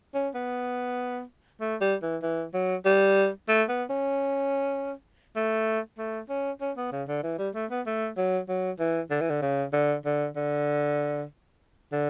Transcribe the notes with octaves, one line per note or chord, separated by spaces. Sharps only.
C#4
B3
A3
G3
E3
E3
F#3
G3
A3
B3
C#4
A3
A3
C#4
C#4
B3
C#3
D3
E3
G3
A3
B3
A3
F#3
F#3
E3
D3
E3
D3
C#3
D3
D3
D3
D3